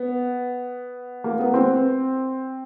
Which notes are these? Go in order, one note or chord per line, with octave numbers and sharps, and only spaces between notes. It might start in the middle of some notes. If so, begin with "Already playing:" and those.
Already playing: B3
A#3
B3
C4